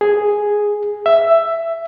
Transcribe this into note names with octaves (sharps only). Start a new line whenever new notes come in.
G#4
E5